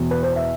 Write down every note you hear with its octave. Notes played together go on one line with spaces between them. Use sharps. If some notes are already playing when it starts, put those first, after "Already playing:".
Already playing: E2 B2
B4
C5
E5